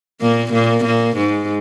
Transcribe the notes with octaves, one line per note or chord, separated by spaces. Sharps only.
A#2 A#3
A#2 A#3
A#2 A#3
G#2 G#3